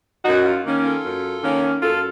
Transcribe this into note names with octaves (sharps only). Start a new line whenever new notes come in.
F#2 D#4 F#4
F4
D#3 A#3 C#4
F4 A4
F#2
D#3 A#3 C#4
F#2 F4 A4